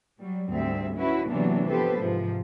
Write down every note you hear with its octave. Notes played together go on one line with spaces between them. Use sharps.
F#3 G3
D2 G#2 G3 C4 E5
C#4 E4 F#4 B4
C3 E3 F#3 A#3 B3 D4
F3 B3 G4 A4 B4 C5
G#2 C3 F3